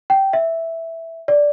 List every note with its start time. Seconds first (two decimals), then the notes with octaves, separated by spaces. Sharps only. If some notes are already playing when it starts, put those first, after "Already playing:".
0.10 G5
0.33 E5
1.28 D5